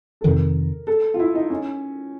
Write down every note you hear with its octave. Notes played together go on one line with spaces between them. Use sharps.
A4
F2 C3 D#3 A#4
A4
F4
E4
D#4
C#4